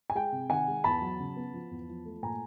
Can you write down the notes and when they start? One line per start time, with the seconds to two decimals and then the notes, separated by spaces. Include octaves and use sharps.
0.10 G#5
0.15 G#3 G5
0.32 C3
0.50 D#3 F#5 G#5
0.68 G#3
0.84 E2 A5 B5
1.02 F#3
1.20 C#3
1.36 B3
1.54 F3
1.71 E2
1.89 F3
2.05 A3
2.23 A#2 G#5 A#5